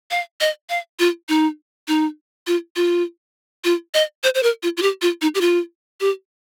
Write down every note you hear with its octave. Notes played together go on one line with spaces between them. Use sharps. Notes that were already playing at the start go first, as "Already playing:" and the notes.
F5
D#5
F5
F4
D#4
D#4
F4
F4
F4
D#5
C5
C5
A#4
F4
F4
G4
F4
D#4
G4
F4
G4